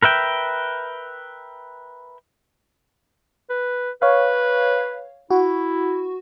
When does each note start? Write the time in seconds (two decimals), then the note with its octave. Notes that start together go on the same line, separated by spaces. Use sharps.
0.03 A#4 B4 E5 G5
3.50 B4
4.02 B4 C#5 F5
5.31 E4 F#4